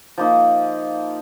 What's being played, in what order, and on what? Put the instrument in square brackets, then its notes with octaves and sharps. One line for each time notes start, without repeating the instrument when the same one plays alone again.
[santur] F3 A#3 D#4